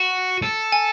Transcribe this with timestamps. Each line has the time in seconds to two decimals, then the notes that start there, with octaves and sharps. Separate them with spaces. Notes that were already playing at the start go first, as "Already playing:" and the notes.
Already playing: F#4
0.42 A4
0.72 G#5